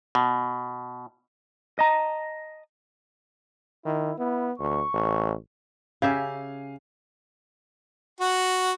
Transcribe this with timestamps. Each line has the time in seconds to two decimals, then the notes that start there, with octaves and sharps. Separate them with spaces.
0.15 B2
1.79 D#5 A5 A#5
3.86 D#3 E4
4.19 B3 E4
4.60 D2 C#6
4.94 A1
6.02 C#3 G4 E5 F5 G#5
8.20 F#4 F#5